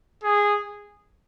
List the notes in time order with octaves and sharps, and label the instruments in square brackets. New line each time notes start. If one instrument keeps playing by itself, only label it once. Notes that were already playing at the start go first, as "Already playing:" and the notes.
[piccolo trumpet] G#4